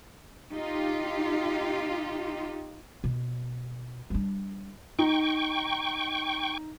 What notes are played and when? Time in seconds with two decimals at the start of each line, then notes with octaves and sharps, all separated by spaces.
0.51 D#4 F4 G4
3.04 B2
4.10 G3 D4
4.99 D#4 G5 C#6